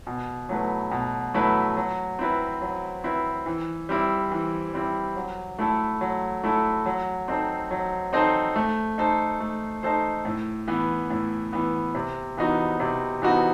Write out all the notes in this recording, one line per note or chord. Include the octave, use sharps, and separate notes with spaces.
B2
F#3 A3 E4 B4
B2
F#3 A3 E4 B4
F#3
C4 E4 B4
F#3
C4 E4 B4
E3
G3 C4 E4
E3
G3 C4 E4
F#3
A3 E4 A4
F#3
A3 E4 A4
F#3
C4 D#4 A4 C5
F#3
C4 D#4 A4 C5
A3
D#4 A4 C5
A3
D#4 A4 C5
A2
E3 B3
A2
E3 B3
C3
E3 B3 D#4 F#4
C3
E3 B3 D#4 F#4